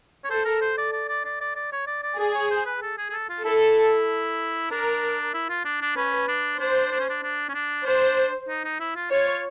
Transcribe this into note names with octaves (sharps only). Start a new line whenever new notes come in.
C#5
A4 C5
A#4
C5
D5
D5
D5
D5
D5
D5
C#5
D5
D5
G#4 D5
C#5
C5
B4
A4
G#4
G#4
A4
F4
E4 A4
D4 A#4
E4
F4
D4
D4
C#4 B4
D4
D4 C5
D4
C#4
D4
D4
C#4
D4
D4 C5
D#4
D#4
E4
F4
F4 C#5